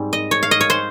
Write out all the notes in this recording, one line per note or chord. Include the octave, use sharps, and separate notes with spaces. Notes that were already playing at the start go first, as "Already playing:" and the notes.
Already playing: G#2 G3 C4
D#5
C#5
F5
D#5
C#5
C5